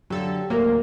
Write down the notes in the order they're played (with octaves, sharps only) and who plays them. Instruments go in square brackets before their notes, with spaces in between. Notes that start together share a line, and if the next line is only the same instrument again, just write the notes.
[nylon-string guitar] D3 G4 F5 [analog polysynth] F#3 A4
[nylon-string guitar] D2 A#4 C5 [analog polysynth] A2 F#3 A#3